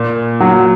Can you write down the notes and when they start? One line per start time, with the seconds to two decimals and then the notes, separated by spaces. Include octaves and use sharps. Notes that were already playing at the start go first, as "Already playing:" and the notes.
Already playing: A#2
0.40 F#3